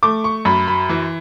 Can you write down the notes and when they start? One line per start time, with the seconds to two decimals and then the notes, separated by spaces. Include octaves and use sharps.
0.03 A3 D6
0.24 C#6
0.45 F#2 B5
0.68 B5
0.89 E3